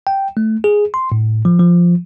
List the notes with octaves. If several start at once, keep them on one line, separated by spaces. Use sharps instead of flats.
G5
A3
G#4
C6
A2
F3
F3